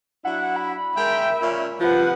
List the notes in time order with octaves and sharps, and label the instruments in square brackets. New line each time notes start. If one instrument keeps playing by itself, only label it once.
[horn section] F#3 D4 E4 [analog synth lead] F#5
[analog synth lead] B5
[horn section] G#3 A#4 G5 [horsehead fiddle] E5
[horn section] A#2 C#4
[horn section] C3 F3 [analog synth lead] F4 [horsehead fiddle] B4 F#5